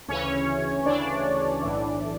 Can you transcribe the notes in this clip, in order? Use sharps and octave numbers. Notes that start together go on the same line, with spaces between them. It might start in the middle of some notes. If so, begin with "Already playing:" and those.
D2 C#3 E3 C#4 C#5
D2 C#3 E3 D4 D5
B1 A2 E3